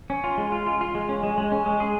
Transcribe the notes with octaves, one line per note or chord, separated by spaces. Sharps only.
C#4
F4
G#3
F4
F4
F4
G#3
C#4
G#3
G#3
C#4
G#3
G#4